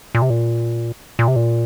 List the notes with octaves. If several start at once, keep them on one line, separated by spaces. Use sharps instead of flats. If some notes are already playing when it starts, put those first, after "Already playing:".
A#2
C3
A#2
A#2
C3
A#2